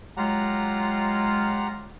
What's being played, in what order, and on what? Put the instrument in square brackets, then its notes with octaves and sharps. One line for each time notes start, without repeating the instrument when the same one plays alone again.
[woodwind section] F#3 G#3 F4 [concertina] G4 F#5 A#5